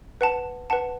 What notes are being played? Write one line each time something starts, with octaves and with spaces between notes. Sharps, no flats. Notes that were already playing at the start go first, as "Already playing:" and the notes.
B4 F#5 A5
B4 F#5 A5